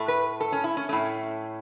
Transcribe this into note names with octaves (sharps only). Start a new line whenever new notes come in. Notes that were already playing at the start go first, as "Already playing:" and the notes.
Already playing: A2 A3
B4
A4
C#4
E4
C#4
A2 A3 C#4